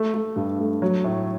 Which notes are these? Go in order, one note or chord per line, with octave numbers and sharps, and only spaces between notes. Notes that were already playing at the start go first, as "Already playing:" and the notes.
Already playing: A3
A3
G2
A3
F#3
A2